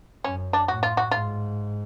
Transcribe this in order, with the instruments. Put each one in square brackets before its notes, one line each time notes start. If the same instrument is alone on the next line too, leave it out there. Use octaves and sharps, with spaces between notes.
[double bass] F#2 [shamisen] C#4
[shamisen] D4
[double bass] A2 [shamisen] F#4
[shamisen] F4
F#4
[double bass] G#2 [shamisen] F4